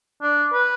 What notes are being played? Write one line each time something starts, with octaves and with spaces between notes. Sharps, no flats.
D4
B4